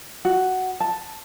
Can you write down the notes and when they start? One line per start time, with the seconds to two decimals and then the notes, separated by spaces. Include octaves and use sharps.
0.25 F#4
0.80 A5